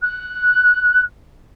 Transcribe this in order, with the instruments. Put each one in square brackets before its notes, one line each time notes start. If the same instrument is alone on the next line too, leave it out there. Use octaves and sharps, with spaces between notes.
[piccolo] F#6